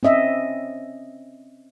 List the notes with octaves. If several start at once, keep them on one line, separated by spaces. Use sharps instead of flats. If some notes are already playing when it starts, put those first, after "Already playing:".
C4 C#4 D#5 E5